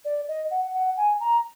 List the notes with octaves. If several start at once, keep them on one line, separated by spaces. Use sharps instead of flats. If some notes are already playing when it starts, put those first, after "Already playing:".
D5
D#5
F#5
F#5
G#5
A#5